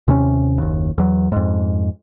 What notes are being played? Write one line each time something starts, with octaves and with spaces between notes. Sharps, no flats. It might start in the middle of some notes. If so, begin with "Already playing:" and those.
D#2 C3 G3 C#4
F#1 D#2
E2 F#3
F2 G#2